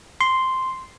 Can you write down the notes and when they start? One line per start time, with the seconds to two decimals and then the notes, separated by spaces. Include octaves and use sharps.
0.21 C6